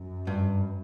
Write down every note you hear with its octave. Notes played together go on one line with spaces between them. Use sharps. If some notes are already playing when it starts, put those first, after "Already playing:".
Already playing: F#2
G2